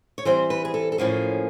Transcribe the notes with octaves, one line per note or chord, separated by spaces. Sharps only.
C#5
E3 G3 C4 C5
B4
G#4
A4
A4
A2 F3 A#3 C#4 G#4